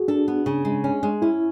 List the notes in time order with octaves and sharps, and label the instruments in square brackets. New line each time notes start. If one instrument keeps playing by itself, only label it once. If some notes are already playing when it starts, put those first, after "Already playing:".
Already playing: [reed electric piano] F#4 G#4
[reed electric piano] D4 [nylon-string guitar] A4
[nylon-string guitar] B3
C#3
G#3
C#4
G#3
[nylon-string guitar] C#4 [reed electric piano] E4